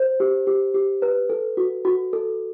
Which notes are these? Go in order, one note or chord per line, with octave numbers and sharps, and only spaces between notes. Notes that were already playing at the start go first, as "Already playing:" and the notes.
Already playing: C5
G4
G4
G4
B4
A4
F#4
F#4
A4